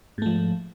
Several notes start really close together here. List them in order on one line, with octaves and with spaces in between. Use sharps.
G#2 A3 F3